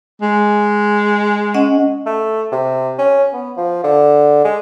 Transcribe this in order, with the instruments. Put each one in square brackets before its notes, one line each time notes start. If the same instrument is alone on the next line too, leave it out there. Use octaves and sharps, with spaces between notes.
[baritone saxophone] G#3
[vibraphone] C#4 D#5 F#5
[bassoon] A3
C3
C#4
B3
F3
D3
G#3